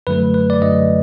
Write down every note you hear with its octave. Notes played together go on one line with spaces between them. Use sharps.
F#2 D3 F#3 A3 B4
B4
D5
F#2 D3 F#3 A3 D#5